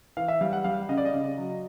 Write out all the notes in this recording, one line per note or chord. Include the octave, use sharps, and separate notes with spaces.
E3 F5
E5
G3 F5
F#5
G3 F5
C#3 D#5
D5
D#5
C#3
F#3